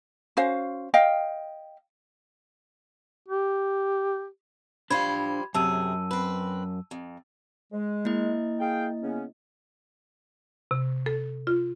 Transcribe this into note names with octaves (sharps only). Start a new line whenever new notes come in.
C#4 F#4 C5 F5
D#5 F5 G5
G4
F3 G3 D4 C5 F5 B5 G#6
F#2 C3 G#4 A5 E6 D#7
C4 B4
F2
G#3
A#3 E4 D#5
G#4 F5 G5
C#3 B3 C#4
C3
A4
F4